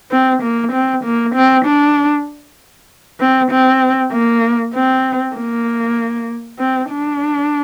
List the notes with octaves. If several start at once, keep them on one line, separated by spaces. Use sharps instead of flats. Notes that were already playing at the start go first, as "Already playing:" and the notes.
C4
A#3
C4
A#3
C4
D4
C4
C4
A#3
C4
A#3
C4
D4